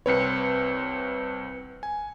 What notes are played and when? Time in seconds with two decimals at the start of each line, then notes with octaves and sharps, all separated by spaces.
0.06 C2 C4 B4 C#5 C#7
1.83 G#5